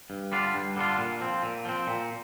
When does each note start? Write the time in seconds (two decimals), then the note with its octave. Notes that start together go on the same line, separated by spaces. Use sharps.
0.10 G2
0.32 D3 G3 D4 F4
0.54 G2
0.76 D3 G3 D4 F4
0.98 A#2
1.20 F3 C4
1.43 A#2
1.65 F3 C4
1.87 A#2